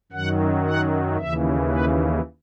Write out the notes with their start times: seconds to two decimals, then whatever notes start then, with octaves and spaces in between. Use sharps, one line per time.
0.12 F#2 D#3 F#3 F#5
0.65 F#5
1.18 D#2 C#3 E3 E5
1.69 B4